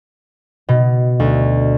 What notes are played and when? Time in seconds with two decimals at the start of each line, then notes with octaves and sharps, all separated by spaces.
0.69 B2
1.20 D2